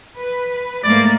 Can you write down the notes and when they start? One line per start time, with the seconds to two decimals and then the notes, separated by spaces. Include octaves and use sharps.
0.19 B4
0.83 G#2 A3 A#3 D5